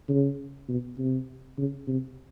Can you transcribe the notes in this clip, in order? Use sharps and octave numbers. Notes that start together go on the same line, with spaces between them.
C#3
B2
C3
C#3
C3